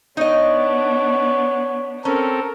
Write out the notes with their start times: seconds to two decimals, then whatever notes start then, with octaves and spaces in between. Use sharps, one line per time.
0.17 B3 D4 D#4 C#5 D#5
2.05 C4 C#4 A4 A#4